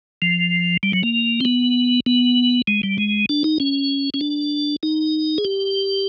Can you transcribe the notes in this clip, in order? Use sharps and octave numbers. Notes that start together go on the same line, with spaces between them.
F3
G3
F#3
A#3
C4
B3
B3
G#3
G3
G#3
D4
D#4
C#4
C#4
D4
D#4
G#4
G4